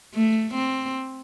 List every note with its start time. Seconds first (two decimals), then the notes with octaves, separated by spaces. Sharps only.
0.14 A3
0.54 C4